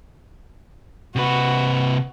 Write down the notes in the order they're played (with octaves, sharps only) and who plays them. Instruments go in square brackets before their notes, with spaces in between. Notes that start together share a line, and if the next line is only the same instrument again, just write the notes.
[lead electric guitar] C3 B4 [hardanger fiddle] F#4